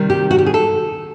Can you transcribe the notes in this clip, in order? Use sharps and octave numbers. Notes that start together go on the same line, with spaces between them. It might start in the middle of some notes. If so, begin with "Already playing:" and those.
Already playing: C3 D#3 G3
G4
F#4
G4
G#4
A4